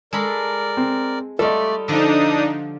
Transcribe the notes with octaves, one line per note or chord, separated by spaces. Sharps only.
G#3 A4 A#4 D5 B5
C4
G3 A3 F4 A4 D5 D#5
D3 F3 D4 D#4 D#6